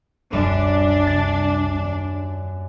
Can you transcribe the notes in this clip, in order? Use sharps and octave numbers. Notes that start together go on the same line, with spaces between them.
D#1 C2 F#2 G3 D4 E7
C2 A6
D#2